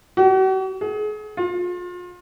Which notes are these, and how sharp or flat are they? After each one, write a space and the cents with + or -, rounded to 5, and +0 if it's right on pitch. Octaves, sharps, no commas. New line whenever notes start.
F#4 +45
G#4 +35
F4 +35